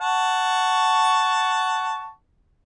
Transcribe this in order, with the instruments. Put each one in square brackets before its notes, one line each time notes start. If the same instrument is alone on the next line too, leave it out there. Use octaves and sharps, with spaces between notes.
[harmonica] F#5 A5 C#6